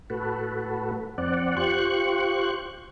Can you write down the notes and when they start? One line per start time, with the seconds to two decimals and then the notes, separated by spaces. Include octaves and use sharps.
0.10 A2 F#4 A4 B4
1.18 F2 C4 D5 F#5
1.57 F4 G4 C5 C#6 F#6